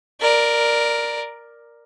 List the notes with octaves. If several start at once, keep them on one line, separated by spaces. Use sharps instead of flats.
A#4 D5